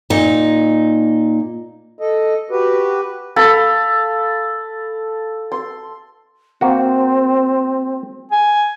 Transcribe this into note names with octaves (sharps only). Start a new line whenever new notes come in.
A#2 D#4
A4 D#5
F#4 G4 B4
A4 F5 B5
C6
A#3 C4 F#4
G#5